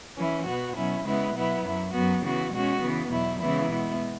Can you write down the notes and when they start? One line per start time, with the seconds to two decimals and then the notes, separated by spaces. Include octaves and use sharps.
0.17 E3 C#4 E4
0.46 B2 B3 F#4
0.75 B2 F#3 C#4 E4
1.05 C#3 G#3 B3 E4
1.35 B2 F#3 B3 E4
1.64 F#2 F#3 E4
1.93 F#2 F#3 B3 F#4
2.23 C#3 E3 B3 F#4
2.53 B2 G#3 C#4 F#4
2.82 C#3 E3 B3
3.11 E2 B2 F#3 E4
3.41 C#3 E3 G#3 B3 E4
3.71 B2 G#3 B3 E4